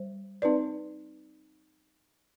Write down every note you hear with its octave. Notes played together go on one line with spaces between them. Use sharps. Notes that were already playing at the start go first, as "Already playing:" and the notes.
Already playing: G3 C5
C4 D#4 B4 D5